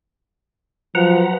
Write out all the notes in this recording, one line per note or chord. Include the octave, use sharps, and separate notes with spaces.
F3 F#3 B4 F#5 A#5